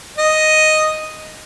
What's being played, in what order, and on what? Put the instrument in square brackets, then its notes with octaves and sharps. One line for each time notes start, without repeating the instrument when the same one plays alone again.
[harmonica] D#5